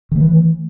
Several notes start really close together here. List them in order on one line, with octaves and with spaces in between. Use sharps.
D#3 A3 E3